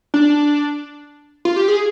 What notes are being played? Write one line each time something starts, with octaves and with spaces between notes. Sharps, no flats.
D4
F4
G4
G#4